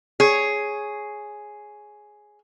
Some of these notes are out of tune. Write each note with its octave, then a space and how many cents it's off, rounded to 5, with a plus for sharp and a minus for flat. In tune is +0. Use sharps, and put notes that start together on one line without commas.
G#4 +5 C#5 +0